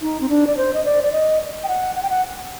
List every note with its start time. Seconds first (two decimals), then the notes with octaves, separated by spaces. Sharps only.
0.02 D#4
0.21 C4
0.29 D4
0.47 D5
0.57 C5
0.74 D#5
0.85 D5
1.04 D5
1.12 D#5
1.64 G5
1.68 F#5
1.96 F#5
2.03 G5
2.10 F#5